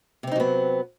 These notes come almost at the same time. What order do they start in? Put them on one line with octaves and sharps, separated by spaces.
C3 C4 D#4 F#3 B3